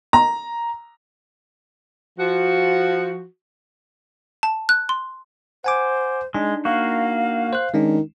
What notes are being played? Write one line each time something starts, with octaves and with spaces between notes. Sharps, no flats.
A#5
F3 F#4
A5
F#6
C6
C5 F#5 G#5 D6
G#3 D4 D#4
A#3 F#4 F5
C5 F#6
D#3 G#3 C#4 D4